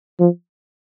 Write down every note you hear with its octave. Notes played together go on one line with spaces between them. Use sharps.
F3